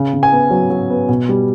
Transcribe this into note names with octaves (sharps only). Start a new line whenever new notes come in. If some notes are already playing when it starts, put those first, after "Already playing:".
Already playing: C#3
C#3
G#5
B3
F#3
F#3
B3
B2
G3